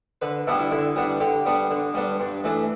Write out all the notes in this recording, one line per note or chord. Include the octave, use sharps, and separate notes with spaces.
D3 B4
G3 B3 D4 E4
E4
D3 E4
G3 B3 D4
D3 G4
G3 B3 D4
D3
G3 B3 D4
G2
E3 A3 D4